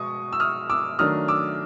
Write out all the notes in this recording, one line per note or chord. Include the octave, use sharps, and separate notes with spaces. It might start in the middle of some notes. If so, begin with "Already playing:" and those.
Already playing: B2 G#3 C#6 D#6
E6
D#6 F6
D6 E6
D#3 F#3 A3 D4 D#6 F6
D6 E6